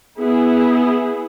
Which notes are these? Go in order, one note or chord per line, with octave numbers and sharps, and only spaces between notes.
B3 E4 G#4